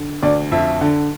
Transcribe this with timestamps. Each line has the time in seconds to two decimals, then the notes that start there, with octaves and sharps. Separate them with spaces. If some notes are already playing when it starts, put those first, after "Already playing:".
Already playing: D3
0.23 D2 D5
0.51 F2 E5
0.81 D3